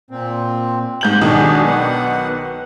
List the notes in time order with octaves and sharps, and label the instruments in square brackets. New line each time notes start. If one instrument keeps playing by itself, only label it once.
[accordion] A#2 C4
[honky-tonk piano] G#2 G6 F#7
[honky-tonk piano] B1 D#3 [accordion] D4 F#4 G#4
[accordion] B3 F#5